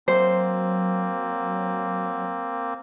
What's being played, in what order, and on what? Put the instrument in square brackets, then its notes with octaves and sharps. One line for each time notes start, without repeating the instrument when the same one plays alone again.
[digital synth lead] F#3 [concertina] A#3 C4 [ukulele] C5